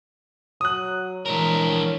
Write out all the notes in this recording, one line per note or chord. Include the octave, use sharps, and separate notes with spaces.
F#3 D#6 F#6
E3 G#3 D4 A#4 C#5